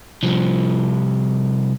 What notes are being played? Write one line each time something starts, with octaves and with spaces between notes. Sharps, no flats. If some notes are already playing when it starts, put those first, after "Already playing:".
C2 F3